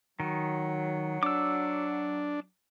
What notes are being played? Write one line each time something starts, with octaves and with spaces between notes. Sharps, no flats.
D#3 F#3
D4 D6 E6